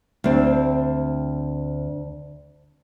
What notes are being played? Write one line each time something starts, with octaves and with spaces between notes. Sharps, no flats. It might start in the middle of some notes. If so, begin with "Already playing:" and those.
D2 C4